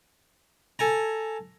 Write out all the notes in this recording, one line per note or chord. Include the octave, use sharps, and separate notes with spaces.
A4 G#5 A#5